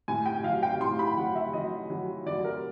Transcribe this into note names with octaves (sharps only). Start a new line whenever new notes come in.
A2 G#5
G5
F#3 F5
G5
A2 C6
B5
F#3 F#5
E5
F#3 D#5
F#3
F#3 D5
A#4